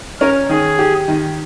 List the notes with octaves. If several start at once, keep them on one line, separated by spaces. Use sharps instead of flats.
C#4 A#4
D#3 G#4
G4
D#3